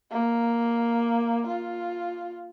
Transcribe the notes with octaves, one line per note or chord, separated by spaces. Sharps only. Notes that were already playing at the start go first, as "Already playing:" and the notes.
A#3
F4